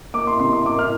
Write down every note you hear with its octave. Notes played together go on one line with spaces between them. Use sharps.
A#3 D6
C6
C3 C6
C6
A#3 D6
F6